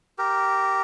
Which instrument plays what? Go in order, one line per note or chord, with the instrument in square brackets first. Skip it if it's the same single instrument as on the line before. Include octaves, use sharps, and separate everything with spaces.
[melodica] G4 A#4